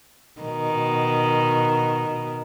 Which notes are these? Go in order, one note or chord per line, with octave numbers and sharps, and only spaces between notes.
B2 D#3